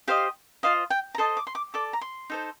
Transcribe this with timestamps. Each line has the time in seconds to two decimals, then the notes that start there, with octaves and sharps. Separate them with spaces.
0.08 G4 C5 D#5 F5
0.63 F4 C5 D#5 F5
0.90 G5
1.15 A#5
1.18 A4 C5 D#5 A5
1.37 D6
1.47 C6
1.55 D6
1.74 A4 D5 D6
1.93 A#5
2.01 C6
2.30 D#4 A4 C5